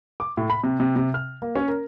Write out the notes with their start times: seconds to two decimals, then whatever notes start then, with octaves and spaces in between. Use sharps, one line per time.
0.20 D6
0.37 A2
0.50 B5
0.64 C3
0.80 C3
0.96 C3
1.14 F6
1.42 A#3
1.56 C#4
1.68 A#4